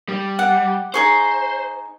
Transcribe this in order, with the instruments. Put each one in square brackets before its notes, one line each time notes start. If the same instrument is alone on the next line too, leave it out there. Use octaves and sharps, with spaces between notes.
[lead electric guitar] G3
[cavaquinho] F#5
[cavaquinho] D#4 G#4 C#6 [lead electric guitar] C5